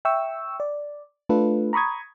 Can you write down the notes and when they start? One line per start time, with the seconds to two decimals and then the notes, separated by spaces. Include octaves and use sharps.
0.05 E5 G5 C#6 E6
0.60 D5
1.29 A3 D4 F4 A4 B4
1.73 A#5 B5 C#6 D#6 G#6